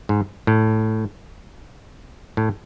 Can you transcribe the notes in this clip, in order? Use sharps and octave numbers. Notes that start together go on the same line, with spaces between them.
G#2
A2
A2